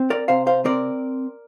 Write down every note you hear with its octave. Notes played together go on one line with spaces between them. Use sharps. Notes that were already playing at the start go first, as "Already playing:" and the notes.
Already playing: C4
A#4 D5
C3 C5 F5
C5 F5
C4 A#4 D5